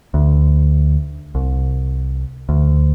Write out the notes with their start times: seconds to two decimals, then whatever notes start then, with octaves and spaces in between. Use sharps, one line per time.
0.14 D2
1.35 C2
2.49 D2